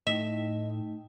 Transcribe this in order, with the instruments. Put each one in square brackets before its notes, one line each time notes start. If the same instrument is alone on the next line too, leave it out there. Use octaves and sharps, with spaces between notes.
[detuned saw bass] A2 [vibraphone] A3 D#4 G5 [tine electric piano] D#5 [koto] E5